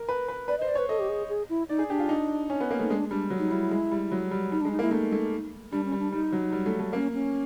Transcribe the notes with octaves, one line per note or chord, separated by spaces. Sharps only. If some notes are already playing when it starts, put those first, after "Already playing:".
Already playing: A#4
B4
B4
B4 D5
D#5
C5
D5
C#5
B4
A4 D#5
G4
G#4
G#4
E4
D#4 D5
G#4
D4 G4
F4
D#4
C#4
B3
A#3
A3 D#4
G#3 D4
G3 D4
F#3
D#4
G3 E4
G#3
G3
F#3
G3
G3 D#4
D4
G#3
D#4
A#3
E4
A3 D#4
A3
G3 D4
C#4
G3
D4
G3 D#4
F#3
G3
A3
A3
A#3 C#4
C#4